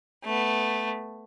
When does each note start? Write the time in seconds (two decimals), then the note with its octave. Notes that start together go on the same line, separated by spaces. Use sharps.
0.24 A3 B3